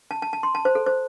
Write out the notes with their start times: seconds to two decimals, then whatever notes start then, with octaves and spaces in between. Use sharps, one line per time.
0.11 A5
0.22 A5
0.33 A5
0.43 C6
0.55 A5
0.65 C5
0.75 A4
0.86 C5